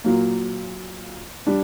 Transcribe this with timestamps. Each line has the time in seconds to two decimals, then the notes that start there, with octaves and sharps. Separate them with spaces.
0.04 A#2 F#3 A#3
1.47 G3 D4